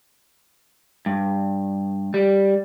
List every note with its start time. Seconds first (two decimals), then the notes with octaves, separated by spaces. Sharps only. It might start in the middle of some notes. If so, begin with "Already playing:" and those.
1.06 G2
2.14 G3